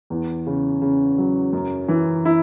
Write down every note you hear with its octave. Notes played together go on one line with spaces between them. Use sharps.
E2
C#3
C#3
F#3
F#2
E3
E4